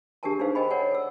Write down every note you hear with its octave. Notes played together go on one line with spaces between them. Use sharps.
D4 G4 G#4 A#4 G#5 A5
D4 D#4 G#4 B4 C5 F5
A#4 C5 D#5 G5 G#5 B5
A#4 C#5 D5 F#5 G#5
A4 E6